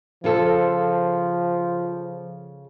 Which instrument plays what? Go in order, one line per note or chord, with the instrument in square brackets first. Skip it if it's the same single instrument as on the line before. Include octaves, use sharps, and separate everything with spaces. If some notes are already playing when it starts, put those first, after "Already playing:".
[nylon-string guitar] C#3 F4 A4 [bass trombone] F3